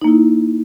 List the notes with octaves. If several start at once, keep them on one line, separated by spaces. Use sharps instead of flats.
A#3 D#4 E4